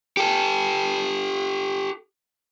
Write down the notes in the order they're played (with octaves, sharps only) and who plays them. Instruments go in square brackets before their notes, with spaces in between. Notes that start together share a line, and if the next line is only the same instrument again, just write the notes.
[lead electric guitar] G4 A4